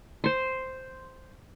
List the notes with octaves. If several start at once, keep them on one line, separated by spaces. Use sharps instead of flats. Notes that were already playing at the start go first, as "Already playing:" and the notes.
C5 C6